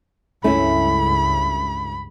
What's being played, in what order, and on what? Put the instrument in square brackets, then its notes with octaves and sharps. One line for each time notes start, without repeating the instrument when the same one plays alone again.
[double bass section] C#2 G2 [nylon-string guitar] A3 C#4 E4 [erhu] B5